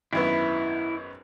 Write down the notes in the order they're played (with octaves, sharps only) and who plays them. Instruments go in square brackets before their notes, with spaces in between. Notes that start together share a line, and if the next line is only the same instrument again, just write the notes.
[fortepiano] G#1 F#2 B3 [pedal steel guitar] E4